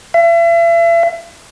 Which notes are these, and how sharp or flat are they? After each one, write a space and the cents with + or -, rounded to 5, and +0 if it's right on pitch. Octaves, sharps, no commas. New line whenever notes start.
E5 +40